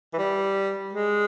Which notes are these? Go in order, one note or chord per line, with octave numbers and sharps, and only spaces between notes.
E3
G3
G#3